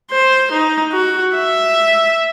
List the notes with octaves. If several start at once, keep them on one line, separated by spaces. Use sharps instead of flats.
C5
D#4
F#4
E5